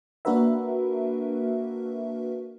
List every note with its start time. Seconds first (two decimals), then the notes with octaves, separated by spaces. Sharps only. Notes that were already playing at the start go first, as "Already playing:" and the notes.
0.25 A#3 D4 F#4 A#4 B4 E5